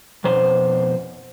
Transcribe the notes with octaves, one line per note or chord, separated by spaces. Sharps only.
F2 B2 C5